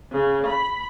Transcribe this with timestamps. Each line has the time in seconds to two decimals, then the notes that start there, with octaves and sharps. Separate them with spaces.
0.12 C#3
0.45 B5